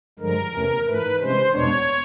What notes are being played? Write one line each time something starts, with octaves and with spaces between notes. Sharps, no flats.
G2 D3 F3 G#3 A#4
E2 C3 E3 A3 C#4
G#2 E3 A3 B4
C3 E3 G#3 C#4 C5
E2 B2 G#3 B3 D4 C#5